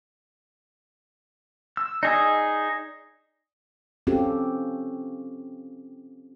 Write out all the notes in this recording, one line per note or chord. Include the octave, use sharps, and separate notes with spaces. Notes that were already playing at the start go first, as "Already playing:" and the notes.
E6
D#4 G#4 D5 G#5 D#6 E6
C4 C#4 F4 G4 A4